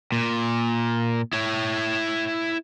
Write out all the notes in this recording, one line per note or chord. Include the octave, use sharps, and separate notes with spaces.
A#2
E4 C#5